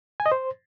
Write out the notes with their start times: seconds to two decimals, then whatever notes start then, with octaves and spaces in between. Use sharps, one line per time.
0.20 G#5
0.26 D#5
0.32 C5